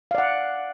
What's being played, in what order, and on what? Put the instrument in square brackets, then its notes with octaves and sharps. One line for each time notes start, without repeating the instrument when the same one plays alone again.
[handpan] F5
D5
F#5